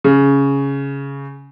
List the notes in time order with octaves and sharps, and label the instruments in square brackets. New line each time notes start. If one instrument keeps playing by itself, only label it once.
[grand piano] C#3